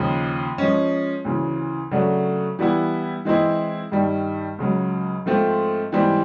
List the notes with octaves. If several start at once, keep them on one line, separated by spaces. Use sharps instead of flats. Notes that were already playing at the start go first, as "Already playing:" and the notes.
Already playing: D#2 C#3 F3
F3 G#3 C#4
D2 C#3 E3
C#3 F#3 A3 D4 F#4
E3 G3 B3 E4
E3 G#3 C4 E4
G2 D#3 G3
C#2 C#3 F#3
G#2 F3 A3 C4 F4
G#2 E3 G3 C4